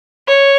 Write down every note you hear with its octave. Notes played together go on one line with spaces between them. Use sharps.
C#5